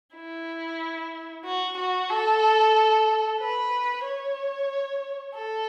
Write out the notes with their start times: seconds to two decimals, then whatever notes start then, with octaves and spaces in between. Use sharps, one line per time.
0.15 E4
1.45 F#4
1.77 F#4
2.10 A4
3.40 B4
4.04 C#5
5.35 A4